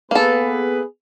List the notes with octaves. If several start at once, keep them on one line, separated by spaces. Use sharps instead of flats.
A#3 B3 G#4 A4 B4